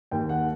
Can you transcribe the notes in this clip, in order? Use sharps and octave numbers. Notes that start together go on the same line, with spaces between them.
D#2 G5
F#5